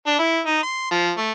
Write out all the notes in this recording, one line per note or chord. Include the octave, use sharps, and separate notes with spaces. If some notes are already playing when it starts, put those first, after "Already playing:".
D4
E4
D#4
C6
F3
A3